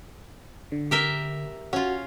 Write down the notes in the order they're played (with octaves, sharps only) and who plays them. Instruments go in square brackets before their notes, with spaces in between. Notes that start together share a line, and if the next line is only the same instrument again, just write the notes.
[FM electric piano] D3
[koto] G4 A#4 E5
[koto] C#4 F4 [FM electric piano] F#4